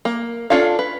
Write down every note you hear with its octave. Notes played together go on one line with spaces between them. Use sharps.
A#3
C#4 D4 F4 A4 F5
B4